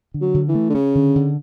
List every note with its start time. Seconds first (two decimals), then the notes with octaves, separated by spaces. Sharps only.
0.14 D3
0.21 F#3
0.34 D3
0.48 E3
0.55 A3
0.70 D3
0.74 C#3 C#4
0.95 D3
1.15 D3